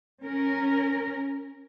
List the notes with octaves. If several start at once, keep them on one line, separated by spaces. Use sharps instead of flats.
C#4 A#4